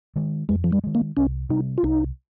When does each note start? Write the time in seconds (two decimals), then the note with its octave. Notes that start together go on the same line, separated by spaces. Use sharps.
0.16 D#3 G#3
0.49 F2 G#3
0.64 F3
0.72 G3
0.84 D#3 G#3
0.95 A#3
1.17 C2 C#4
1.49 C3 G3 D#4
1.78 F4
1.83 C2 D#4